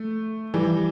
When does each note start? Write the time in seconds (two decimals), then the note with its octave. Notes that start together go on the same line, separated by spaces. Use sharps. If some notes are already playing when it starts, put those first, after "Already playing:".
Already playing: A3
0.54 E3 G3